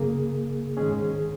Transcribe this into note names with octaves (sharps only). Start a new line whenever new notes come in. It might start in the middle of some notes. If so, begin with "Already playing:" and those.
Already playing: F#2 C#3 A#3 G#4
G#2 D#3 G#3 C#4 G#4